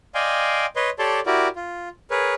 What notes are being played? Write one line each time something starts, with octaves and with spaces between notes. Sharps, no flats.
D5 D#5 F5 G5 G#5 C6
B4 C#5 D#5 C6
G4 A4 C#5 D5 A5 C6
E4 F#4 G4 A#4 D5
F4
G#4 A#4 B4 C#5